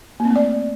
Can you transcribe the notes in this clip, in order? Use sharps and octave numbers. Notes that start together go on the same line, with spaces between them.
A#3
C4
A3
D5